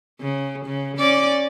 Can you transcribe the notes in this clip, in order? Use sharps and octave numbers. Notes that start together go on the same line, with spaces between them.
C#3
C#3
C#4 D5